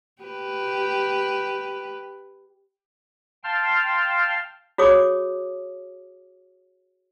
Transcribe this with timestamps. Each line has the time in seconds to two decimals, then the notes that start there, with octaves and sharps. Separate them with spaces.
0.22 G4 B4
3.44 F5 G5 A5 C6 F6
4.78 F#4 G#4 C#5 D6 D#6